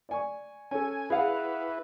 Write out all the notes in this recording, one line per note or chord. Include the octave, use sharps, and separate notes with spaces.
D5 G#5 C#6
C#4 A4 G#5
E4 G#4 B4 F5 F#5